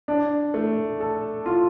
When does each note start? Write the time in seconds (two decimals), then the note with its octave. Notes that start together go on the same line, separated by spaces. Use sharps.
0.08 D4
0.54 A3
1.00 A4
1.46 F4